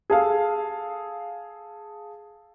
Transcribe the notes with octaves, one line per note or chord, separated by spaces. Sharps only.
G#4 A4 F5